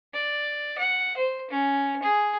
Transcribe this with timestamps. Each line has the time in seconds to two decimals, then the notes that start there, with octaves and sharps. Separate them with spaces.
0.14 D5
0.78 F#5
1.17 C5
1.51 C#4
2.03 G#4